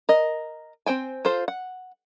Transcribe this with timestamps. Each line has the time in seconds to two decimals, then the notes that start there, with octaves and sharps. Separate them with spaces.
0.09 A#4 D#5
0.86 C4 C5 G5 G#5
1.25 F4 A4 C5
1.48 F#5